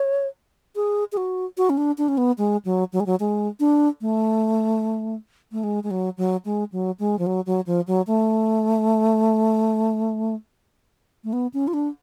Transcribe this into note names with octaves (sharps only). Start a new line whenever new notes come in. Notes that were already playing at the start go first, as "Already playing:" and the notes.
Already playing: C#5
G#4
G#4
F#4
F#4
C#4
D4
D4
C#4
B3
G#3
F#3
F#3
G#3
F#3
G#3
D4
A3
A3
G#3
G#3
F#3
F#3
G#3
F#3
G#3
F3
F#3
F#3
F3
F#3
A3
A3
B3
C#4
F4
D4